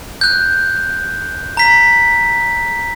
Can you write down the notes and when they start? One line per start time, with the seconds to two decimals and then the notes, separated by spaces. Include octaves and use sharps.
0.21 F#6 G6
1.57 A#5 B6